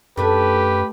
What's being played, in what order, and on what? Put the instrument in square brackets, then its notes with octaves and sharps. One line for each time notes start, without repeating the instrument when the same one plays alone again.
[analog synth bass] F#2 [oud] A3 D4 A4 [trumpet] G4 [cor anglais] B4